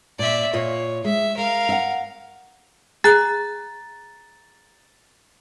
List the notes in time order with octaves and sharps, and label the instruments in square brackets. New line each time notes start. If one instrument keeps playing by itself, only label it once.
[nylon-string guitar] A#2 [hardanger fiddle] D5 E5
[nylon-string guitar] A#2 F4 D#5 [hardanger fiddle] C#5
[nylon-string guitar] G#3 [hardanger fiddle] E5
[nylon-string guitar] G#3 [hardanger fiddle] A#4 F5
[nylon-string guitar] E5 F#5
[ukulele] G#4 [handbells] A#5 F#6 [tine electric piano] A6